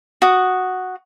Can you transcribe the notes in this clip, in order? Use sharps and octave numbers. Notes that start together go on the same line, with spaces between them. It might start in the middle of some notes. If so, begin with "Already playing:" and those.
F#4 D#6